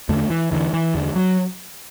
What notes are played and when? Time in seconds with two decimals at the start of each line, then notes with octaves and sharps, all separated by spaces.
0.09 E2 D3 A3
0.30 E3
0.51 E2 D3 E3
0.74 E3
0.95 E2 D3
1.15 F#3